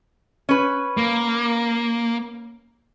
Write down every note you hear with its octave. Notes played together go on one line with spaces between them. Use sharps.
C#4 B4
A#3